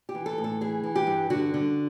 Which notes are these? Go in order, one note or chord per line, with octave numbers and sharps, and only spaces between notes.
G4
E3
A4
A2
A4
E3 G#4
E3
G4
G2
D3 F#4
D3